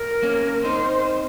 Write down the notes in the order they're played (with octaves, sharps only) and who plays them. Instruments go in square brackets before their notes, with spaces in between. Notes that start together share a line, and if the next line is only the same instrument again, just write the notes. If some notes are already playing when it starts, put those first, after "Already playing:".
Already playing: [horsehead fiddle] A#4
[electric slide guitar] A#3 C#4
[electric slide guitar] C4 D#4 [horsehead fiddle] C5